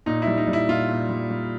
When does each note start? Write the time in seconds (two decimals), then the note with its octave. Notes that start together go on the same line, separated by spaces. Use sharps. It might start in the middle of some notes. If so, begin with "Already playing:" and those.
0.06 A#2 D#4
0.22 G3 E4
0.37 D#4
0.47 G3
0.53 E4
0.68 A#2 F4
0.89 A#2
1.09 G3
1.30 G3